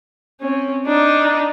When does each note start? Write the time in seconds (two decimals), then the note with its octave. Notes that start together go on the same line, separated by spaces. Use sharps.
0.41 C4 C#4
0.86 D4 D#4